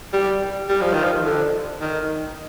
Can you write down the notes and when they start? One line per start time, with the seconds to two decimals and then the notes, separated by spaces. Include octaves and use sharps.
0.13 G3
0.69 G3
0.81 F3
0.93 D#3
1.04 F3
1.25 D3
1.81 D#3